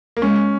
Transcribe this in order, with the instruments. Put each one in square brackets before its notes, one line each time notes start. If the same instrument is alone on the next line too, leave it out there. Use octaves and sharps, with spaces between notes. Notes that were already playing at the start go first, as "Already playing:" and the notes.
[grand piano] A#3
[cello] G#3 [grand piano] C#4